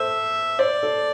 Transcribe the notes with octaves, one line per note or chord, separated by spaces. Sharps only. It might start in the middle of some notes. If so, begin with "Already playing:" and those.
Already playing: A4 C5 E5
C5 D5
A4